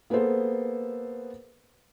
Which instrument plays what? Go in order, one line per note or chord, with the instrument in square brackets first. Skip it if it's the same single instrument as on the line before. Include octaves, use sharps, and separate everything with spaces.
[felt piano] A#3 B3 G#4 A4 C5